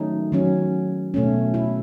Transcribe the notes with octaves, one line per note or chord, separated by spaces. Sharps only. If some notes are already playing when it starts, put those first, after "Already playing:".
Already playing: D#3 F#3 A3 C#4 D#4
D#3 F#3 C#4
B2 A3 C#4
E4